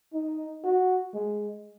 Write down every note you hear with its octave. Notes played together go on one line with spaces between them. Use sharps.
D#4
F#4
G#3